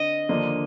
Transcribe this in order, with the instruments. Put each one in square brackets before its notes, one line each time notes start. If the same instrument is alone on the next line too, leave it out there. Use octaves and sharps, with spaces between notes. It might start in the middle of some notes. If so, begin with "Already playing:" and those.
Already playing: [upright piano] D3 C4 [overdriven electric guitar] D#5
[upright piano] D#2 D3 F3 A#3 D4